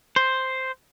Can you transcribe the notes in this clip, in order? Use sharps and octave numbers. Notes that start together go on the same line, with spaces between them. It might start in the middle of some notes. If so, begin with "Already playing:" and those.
C5